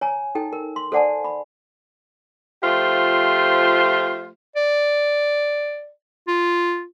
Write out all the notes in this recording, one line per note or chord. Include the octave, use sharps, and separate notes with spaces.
C#5 G#5 A#5
D#4 A4 G5
A#4
C6
A4 C5 D5 F#5 G#5 A5
B5
F3 A3 F4 G4 C5
D5
F4